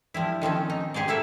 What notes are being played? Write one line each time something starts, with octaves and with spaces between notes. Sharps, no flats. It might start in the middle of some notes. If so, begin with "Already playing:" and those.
F3 G3 E4
D#3 F3 C4 C#4
D#4
G4 G#4 C5 D5
A#3 E4 A4 E5